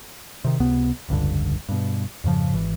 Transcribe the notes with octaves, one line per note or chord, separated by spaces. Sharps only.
C3 D#3
C#2 C3 B3
F1 C#2 G2 D3
G2 B2
F2 G#2 C#3 F3
G#1 E3